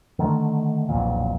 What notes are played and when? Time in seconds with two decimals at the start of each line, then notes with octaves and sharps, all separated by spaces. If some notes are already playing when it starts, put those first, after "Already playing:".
0.19 D3 D#3 A3
0.89 E1 B1 F2 A#2